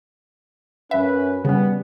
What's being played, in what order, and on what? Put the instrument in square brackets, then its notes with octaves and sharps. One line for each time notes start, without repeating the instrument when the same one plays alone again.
[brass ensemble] F#2 C#4 B4 [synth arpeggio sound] E5
[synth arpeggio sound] C#3 C#4 [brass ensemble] G3 B3